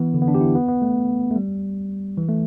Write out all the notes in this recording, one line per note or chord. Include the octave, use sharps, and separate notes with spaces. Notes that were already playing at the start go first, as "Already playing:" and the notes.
Already playing: E3 B3
D3
B3
D4
G4
E4
B3
B3
A3
A3
G3
E3
A3